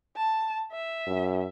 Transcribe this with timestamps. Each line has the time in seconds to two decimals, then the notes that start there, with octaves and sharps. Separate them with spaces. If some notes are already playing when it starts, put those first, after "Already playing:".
0.16 A5
0.72 E5
1.07 F#2